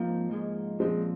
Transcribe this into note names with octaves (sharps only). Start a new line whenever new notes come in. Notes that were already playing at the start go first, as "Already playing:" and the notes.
Already playing: G#2 F3 A#3 C4
G#2 F3 G#3
A#2 F3 G#3 C4